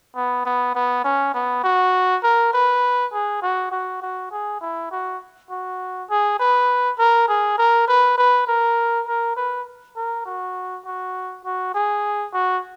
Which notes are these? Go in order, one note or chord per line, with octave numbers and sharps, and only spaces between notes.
B3
B3
B3
C#4
B3
F#4
A#4
B4
G#4
F#4
F#4
F#4
G#4
E4
F#4
F#4
G#4
B4
A#4
G#4
A#4
B4
B4
A#4
A#4
B4
A#4
F#4
F#4
F#4
G#4
F#4